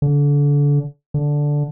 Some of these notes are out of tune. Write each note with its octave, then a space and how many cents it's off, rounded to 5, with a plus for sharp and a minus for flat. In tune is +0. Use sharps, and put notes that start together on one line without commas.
D3 -30
D3 -5